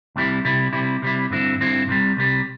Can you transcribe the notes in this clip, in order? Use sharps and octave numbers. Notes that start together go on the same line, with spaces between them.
C2 C3 G3 E4
C2 C3 G3 E4
C3 G3 E4
C3 G3 E4
G2 D3 C4 E4
G2 D3 C4 E4
C2 C3 G3
C2 C3 G3